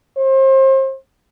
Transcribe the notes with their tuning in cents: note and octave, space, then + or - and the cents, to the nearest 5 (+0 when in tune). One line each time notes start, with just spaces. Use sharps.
C5 +35